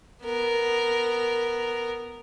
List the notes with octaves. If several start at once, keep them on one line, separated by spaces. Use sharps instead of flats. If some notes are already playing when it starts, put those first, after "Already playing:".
B3 A#4